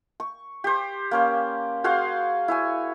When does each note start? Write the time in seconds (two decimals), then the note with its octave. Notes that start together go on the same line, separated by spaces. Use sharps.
0.20 C#6
0.64 G4 C5
1.11 A#3 C#4 C5
1.84 F#4 G#4 C5 F5
2.48 E4 C#5 G#5